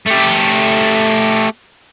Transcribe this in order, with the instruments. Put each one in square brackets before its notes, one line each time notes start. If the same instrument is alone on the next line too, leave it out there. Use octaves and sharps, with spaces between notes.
[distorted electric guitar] A3 G4